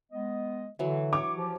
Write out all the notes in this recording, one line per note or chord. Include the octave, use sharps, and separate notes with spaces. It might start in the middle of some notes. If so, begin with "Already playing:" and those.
G#3 B3 D#5
D3 E3 F#3
C#5 D6
F3 G4